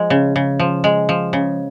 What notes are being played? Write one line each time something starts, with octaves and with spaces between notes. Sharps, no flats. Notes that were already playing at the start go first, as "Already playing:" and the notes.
Already playing: F3 G#3
C#3
C#3
F3
G#3
F3
C#3